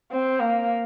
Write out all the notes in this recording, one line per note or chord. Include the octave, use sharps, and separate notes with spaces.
C4
A#3